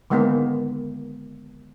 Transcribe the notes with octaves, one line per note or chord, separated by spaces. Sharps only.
D3 D#3 G#3 A#3 B3